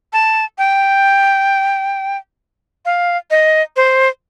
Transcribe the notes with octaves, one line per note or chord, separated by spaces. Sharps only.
A5
G5
F5
D#5
C5